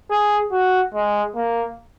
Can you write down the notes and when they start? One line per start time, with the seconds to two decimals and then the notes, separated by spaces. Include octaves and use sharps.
0.10 G#4
0.52 F#4
0.94 G#3
1.36 A#3